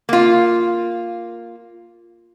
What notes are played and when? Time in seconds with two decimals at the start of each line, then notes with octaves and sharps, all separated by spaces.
0.09 A#3 F4